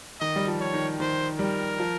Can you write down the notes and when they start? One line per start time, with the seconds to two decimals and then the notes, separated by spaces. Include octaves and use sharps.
0.20 D#3 D#5
0.36 G3
0.47 F3
0.61 C#5
0.74 D#3
1.00 D#3 C5
1.39 G3 A#4
1.79 F3